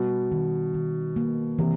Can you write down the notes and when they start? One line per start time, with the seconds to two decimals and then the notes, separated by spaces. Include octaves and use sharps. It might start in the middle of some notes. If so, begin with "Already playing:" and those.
Already playing: B2 G3
0.32 D#3
0.74 D#3
1.16 A#3
1.59 C3 E3